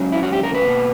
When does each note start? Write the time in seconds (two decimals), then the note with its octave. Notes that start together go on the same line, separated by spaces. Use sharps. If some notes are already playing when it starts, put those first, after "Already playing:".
Already playing: C#2 C#3 F#3
0.12 E4
0.23 F#4
0.33 G4
0.43 A#4
0.54 B4
0.64 B2 A#3